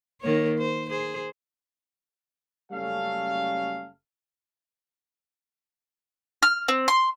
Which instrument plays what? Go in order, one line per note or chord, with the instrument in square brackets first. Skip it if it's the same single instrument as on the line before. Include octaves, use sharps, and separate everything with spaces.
[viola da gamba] D#3 A#3 C#5
C5
G#4 C5
[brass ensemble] F#1 G3 A3 C#4 A4 F5
[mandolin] F6
C4
C6